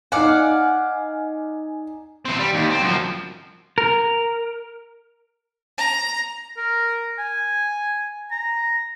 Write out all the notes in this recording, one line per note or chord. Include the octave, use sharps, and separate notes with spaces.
D#4 D5 F5 F#5 G#5
E3 C4
G3
D#2
C4
F#2 F3
A#4
A#5
A#4
G#5
A#5